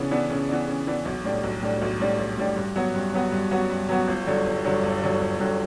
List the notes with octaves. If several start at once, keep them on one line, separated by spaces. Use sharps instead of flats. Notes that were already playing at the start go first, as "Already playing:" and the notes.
Already playing: C#3 E3 B3 D4
E3 B3 D4
C#3
E3 B3 D4
C#3
E3 B3 D4
B1
A2 G3 D4
B1
A2 G3 D4
B1
A2 G3 D4
B1
A2 G3 D4
G2
F#3 B3 F#4
G2
F#3 B3 F#4
G2
F#3 B3 F#4
G2
F#3 B3 F#4
G1
G2 D3 F#3
G1
G2 D3 F#3
G1
G2 D3 F#3
G1
G2 D3 F#3